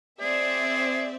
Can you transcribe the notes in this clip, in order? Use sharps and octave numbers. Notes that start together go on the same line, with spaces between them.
C4 G#4 D5 E5